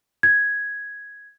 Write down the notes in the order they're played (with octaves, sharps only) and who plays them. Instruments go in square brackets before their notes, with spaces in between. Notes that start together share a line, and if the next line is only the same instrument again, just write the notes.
[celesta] G#6